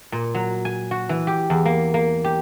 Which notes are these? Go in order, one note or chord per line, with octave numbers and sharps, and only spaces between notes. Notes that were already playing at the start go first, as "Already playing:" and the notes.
A#2
F#3
G#5
F#4
E3
G4
E2
A#3
A#3
G4